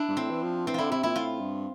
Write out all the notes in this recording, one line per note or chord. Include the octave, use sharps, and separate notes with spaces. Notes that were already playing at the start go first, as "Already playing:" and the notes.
Already playing: D4 E4
G2
A2 C4
E3
F3
E3 C4
D3 E4 F4
C3 E4
A#2 E4
A2 F4
G2